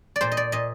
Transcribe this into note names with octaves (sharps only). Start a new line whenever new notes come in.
D5
A#2 C5
D#5
D5
A#2 D#5